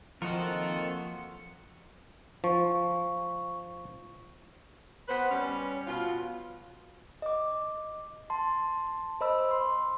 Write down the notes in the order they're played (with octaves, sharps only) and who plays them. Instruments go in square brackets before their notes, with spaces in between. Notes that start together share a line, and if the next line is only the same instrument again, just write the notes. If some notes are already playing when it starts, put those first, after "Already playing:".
[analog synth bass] F3 [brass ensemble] A#3 C4 A4 [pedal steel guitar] F4 F#4 [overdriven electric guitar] A#4 D#5
[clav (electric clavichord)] F3 [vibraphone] C#6
[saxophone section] B3 B4 C5
G3 C#4
B2 F4
[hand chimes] D#5 D6
A5 C6
C5 D#5 B5 E6
C6